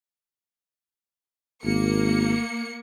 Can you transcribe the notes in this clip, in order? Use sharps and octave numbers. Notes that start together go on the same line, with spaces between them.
G#1 A#3 C#7